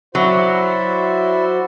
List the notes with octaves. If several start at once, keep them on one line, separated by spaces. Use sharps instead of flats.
F#3 E4 F#4 C5 D5 E5